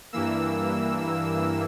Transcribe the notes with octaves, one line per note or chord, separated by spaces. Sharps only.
G2 E3 A#3 E6